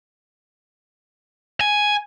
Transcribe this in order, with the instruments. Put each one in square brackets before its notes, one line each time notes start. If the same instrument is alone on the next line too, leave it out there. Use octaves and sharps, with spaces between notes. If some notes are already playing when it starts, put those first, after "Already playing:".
[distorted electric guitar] G#5